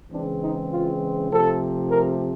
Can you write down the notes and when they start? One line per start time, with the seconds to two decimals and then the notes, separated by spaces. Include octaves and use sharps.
0.12 C#3 E3 G#3 C4 D4
0.42 D#4
0.71 F4
1.30 C3 F3 A3 C4 A4
1.90 A#4